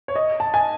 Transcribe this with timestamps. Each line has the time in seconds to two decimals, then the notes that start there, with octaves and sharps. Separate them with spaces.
0.08 C#5
0.15 D#5
0.40 A5
0.54 G#5